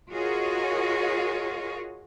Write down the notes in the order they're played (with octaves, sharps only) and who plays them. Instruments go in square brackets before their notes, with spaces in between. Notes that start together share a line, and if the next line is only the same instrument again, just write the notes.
[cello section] F4 F#4 G#4 A#4 C#5 D#5